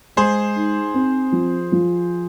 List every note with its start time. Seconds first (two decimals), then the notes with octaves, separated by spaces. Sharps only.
0.16 G#3 G#4 C5
0.56 D#4
0.94 C4
1.32 F3
1.72 F3